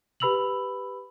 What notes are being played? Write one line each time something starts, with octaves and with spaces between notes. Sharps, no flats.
G4 B4 B5 E6 F7 F#7